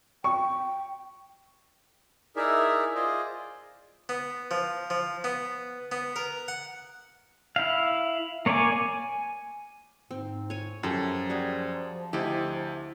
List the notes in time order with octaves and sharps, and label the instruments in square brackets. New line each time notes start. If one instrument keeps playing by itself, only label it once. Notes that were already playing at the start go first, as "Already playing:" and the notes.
[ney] G5 [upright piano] C#6
[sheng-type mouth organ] D#4 E4 G#4 A#4 D5 E5
F4 G#4 C5 D5 D#5
[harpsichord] B3
F3
F3
B3
B3
A#4
F#5
[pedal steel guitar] E4 F5
A#3 C#5 D5 G#5 D6
G#5
[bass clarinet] G#2 [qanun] C4
[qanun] C#5 G#5
[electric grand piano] F#2 [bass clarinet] F3 [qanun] G4 A4 E5
[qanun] G3 F#4 G#4
[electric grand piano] D2 G4 [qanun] E4 D#5